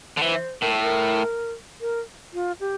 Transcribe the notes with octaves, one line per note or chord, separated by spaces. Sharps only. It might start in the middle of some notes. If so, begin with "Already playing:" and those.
D3
E3 C5
A2 A#4
A4
A#4
A#4
F4
G4